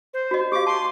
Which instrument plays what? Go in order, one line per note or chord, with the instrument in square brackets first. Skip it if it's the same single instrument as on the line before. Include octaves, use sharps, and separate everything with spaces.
[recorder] C5
[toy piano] F#4 D#5
[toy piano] G4 F5 [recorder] D6
[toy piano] A5 [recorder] C6